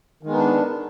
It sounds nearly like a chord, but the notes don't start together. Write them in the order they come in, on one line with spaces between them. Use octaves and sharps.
D#3 G#3 B3 D#4 D4